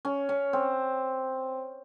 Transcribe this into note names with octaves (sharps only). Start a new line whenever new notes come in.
C#4
C#4
C4